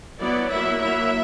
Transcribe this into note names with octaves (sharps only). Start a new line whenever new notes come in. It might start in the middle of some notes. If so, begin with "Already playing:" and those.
F#3 B3 E4 D5
F#3 A#3 E4 E5
F#3 A#3 E4 E5